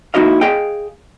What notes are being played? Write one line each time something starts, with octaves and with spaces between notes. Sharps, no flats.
A#3 D#4 E4 F#4 D#5 F5
G#4 D#5 F5 G5